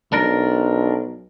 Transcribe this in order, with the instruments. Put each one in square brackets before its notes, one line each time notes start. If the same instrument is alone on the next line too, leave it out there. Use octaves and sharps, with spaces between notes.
[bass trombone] B1 [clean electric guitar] D4 A#4